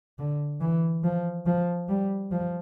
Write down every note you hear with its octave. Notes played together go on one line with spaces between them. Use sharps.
D3
E3
F3
F3
G3
F3